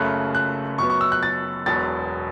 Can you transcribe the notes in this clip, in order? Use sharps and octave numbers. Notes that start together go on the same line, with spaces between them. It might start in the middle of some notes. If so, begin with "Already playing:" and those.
Already playing: F#1 F#2 C#3 A3 F#6
F#6
F#2 F#3 B3 C#6
C#6
E6
F#6
A6
E1 E2 B2 F#3 A6